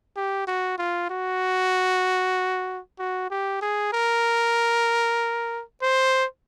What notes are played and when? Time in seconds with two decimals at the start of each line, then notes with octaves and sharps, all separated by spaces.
0.16 G4
0.47 F#4
0.78 F4
1.10 F#4
2.99 F#4
3.30 G4
3.62 G#4
3.93 A#4
5.82 C5